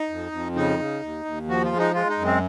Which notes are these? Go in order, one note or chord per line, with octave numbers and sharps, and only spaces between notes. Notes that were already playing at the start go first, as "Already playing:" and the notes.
Already playing: D#4
F2
F2
C#3 D#4
C#3
D#2
D#2
F3 F#4
F4
G#3
D#4
G#3 F4
D#4
F#2
C4